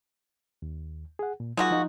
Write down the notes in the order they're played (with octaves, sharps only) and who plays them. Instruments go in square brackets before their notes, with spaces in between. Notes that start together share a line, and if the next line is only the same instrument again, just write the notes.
[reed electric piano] D#2
G#4 F#5
A#2
[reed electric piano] F#3 D#4 F4 [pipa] G#3 A#3 F#4
[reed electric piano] F3 D#4